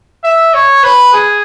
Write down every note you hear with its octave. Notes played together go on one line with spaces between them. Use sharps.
E5
C#5
B4
G#4